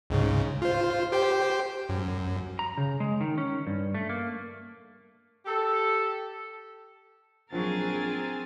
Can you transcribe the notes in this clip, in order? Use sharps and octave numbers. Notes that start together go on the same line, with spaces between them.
C#2 G#2 C#3
F4 C5
G4 C5 G5
F#2
A#5
C#3
G#3
D#3
C#4
G2
A3
A#3
G4 A4
A#1 F3 F#3 C4 G#4 A#4 G#5 A6